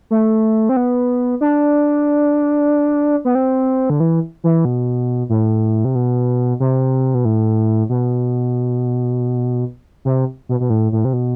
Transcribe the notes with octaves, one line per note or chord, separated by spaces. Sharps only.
A3
C4
B3
D4
B3
C4
D3
E3
E3
B2
A2
C3
B2
C3
B2
A2
B2
C3
B2
B2
A2
A2
C3
B2